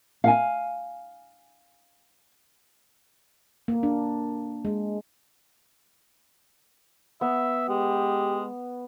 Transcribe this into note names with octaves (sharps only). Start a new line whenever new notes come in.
F5 F#5 G#5
A#3
D4
G#3
B3 E5
G#3 G4